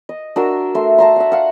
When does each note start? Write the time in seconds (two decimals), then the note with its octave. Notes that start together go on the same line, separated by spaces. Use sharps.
0.09 D#5
0.36 D4 F#4 A#4 E6
0.75 A3 C6
0.98 A5 A#5 C6
1.16 E5 F#5
1.32 F5 F#5